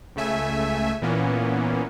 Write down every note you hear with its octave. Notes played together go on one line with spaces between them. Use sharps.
C#2 C#3 A3 E5 G#5
A#2 E3 A#3 B3 C#4